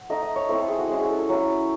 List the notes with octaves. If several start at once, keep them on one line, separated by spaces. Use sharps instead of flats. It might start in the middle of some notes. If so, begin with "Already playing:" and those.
Already playing: F#5
A3 D#4 D#5
D#5
C#5
A3 C4 E4 C5
A4
G#4
F#4
G#3 C#4 E4 G#4
G#4
A4
A4
F#3 C#4 E4